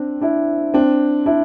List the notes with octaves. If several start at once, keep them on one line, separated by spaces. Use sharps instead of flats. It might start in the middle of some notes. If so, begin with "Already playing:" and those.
Already playing: C4 D4
D4 E4
C4 D4
D4 E4